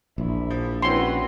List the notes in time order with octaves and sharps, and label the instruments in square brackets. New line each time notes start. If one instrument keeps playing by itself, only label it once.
[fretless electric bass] A#1 [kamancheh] E4
[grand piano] F3
[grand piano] C4 C#4 E4 [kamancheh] F#4 B4 [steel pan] C6